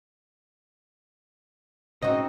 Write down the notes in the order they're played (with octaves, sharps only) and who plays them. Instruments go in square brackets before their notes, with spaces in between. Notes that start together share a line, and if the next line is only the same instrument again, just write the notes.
[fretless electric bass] C#3 [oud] C4 D#4 F#4 [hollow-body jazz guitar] D#5